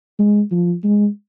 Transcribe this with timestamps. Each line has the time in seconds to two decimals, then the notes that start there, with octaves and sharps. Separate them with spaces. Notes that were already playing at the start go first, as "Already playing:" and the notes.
0.19 G#3
0.51 F3
0.84 G#3